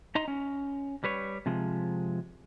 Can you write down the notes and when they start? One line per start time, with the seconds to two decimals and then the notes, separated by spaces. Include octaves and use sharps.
0.15 D#4 D#5 A#5 C6
0.28 C#4
1.04 G3 B4 C#5
1.46 C3 F3 G#3